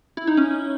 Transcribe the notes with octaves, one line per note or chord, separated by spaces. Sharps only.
E4
D#4
C#4